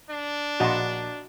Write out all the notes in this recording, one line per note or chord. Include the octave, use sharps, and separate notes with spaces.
D4
A#1 F#4 D#5 A5 C6